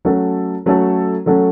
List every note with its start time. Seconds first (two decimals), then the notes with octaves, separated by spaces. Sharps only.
0.05 F#3 A3 C#4 F#4 A4
0.66 F#3 A3 C#4 F#4 A4
1.26 F#3 A3 C#4 F#4 A4